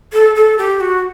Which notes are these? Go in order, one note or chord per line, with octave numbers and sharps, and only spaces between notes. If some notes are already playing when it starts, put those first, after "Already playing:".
A4
A4
G4
F#4